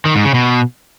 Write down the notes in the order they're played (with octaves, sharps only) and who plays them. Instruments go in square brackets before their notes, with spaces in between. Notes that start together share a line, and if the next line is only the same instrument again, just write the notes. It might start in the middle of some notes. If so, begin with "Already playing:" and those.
[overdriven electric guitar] D#3
G#2
C#3
B2